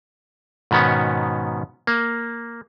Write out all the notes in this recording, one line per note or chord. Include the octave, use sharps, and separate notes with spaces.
G#2 B2 D#3 B3 C#4
A#3